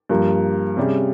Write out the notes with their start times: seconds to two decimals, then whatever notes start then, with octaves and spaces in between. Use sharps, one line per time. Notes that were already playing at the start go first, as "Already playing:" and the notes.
0.09 G2 F3 A#3
0.77 C3 G3 C#4 G#4